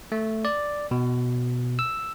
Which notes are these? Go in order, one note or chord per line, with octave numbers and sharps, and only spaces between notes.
A3
D5
B2
E6